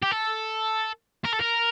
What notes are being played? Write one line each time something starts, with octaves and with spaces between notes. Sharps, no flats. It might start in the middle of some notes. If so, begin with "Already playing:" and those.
G4
A4
A#4
A4
A#4